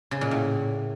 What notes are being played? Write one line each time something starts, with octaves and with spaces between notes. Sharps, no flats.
C#3
A#2
A2